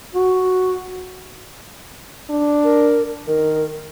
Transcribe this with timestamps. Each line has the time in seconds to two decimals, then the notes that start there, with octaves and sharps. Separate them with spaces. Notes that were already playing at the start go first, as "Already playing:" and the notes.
0.15 F#4
2.30 D4
2.64 A#4
3.28 D#3 A#4